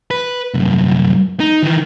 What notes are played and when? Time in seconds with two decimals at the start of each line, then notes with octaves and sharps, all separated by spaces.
0.11 B4
0.54 C2 F#2
1.40 D#4
1.63 D#3 E3